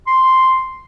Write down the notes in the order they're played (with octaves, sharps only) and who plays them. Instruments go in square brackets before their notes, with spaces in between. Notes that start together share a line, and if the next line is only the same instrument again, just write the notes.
[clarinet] C6